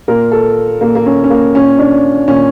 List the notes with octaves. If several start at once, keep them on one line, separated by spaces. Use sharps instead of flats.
A#2 A#4
A4
A#2 A#3
A#3
C#4
C#4
A#3
A#2 C#4
D4
A#2 C#4